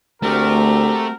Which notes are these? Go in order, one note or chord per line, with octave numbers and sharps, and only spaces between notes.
D2 A3 C4 F#4 G4 A#4